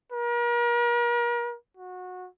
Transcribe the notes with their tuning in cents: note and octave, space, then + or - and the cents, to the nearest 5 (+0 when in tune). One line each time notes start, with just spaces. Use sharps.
A#4 +40
F#4 -20